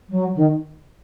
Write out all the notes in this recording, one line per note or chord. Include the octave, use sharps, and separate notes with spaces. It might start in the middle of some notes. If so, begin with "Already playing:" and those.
F#3
D#3